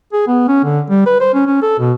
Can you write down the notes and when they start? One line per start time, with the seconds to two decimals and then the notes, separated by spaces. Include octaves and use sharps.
0.13 G#4
0.28 B3
0.48 C#4
0.64 D3
0.90 G3
1.06 B4
1.21 C5
1.34 C#4
1.47 C#4
1.62 A4
1.79 B2